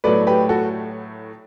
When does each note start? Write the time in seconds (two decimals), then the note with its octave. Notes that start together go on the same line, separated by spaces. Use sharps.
0.04 A2 F#3 A3 B4 D5
0.27 G4 B4
0.49 F#4 A4